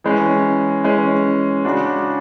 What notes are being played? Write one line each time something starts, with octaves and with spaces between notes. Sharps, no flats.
E3 G#3 C#4
E3 G#3 C#4
C#3 G#3 D4 F#4